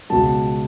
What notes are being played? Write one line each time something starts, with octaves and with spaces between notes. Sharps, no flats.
C#2 B2 F#3 A5